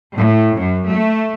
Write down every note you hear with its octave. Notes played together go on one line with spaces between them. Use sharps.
A2
F#2
A3